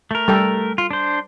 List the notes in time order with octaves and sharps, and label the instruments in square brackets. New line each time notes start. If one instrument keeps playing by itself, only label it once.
[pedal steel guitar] A3 A#4
[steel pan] G3 A4 G5
[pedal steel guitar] F4
D4 C5